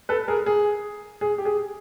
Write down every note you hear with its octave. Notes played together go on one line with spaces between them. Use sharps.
A4 B4
G#4 A#4
G#4
G#4
G4
G#4